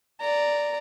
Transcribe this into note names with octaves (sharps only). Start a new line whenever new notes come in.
D5 A#5